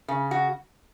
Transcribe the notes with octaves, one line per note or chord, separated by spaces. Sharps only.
C#3
F#4